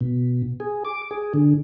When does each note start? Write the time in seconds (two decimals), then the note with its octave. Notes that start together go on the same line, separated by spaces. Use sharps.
0.01 B2
0.60 G#4
0.85 D6
1.11 G#4
1.34 D3